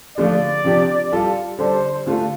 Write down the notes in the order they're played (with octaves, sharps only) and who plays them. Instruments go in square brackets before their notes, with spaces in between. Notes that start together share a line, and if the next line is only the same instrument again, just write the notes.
[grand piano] D3 F3 A3 F4 [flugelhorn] D5
[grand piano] C3 F3 D4 G4
G3 F4 A4
[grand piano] D3 G3 D4 A4 [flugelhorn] C5
[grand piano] D3 A3 F4 A4